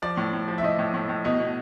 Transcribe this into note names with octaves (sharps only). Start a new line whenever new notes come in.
F3 D5
A2
A2
F3
E5
A2 D#5
A2
A2
A2
B2 D#5
B2